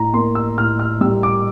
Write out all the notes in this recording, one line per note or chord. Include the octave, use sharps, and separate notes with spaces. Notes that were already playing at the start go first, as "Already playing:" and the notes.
Already playing: A2 A#5
A#3 C6
E6
A2 F6
F6
G3 E6
D6